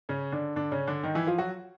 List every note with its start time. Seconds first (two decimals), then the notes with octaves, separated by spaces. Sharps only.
0.09 C#3 C#4
0.32 D3 D4
0.56 D3 D4
0.72 C#3 C#4
0.87 D3 D4
1.03 D#3 D#4
1.15 E3 E4
1.27 F3 F4
1.38 F#3 F#4